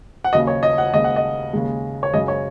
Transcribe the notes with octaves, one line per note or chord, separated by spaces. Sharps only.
F#5
D#2 C#3 F#3 D#5
C#5
D#5
F#5
D#2 C#3 G#3 D#5
F#5
D#5
D#2 C#3 G#3
C#5
F#2 C#3 G#3 D#5
C#5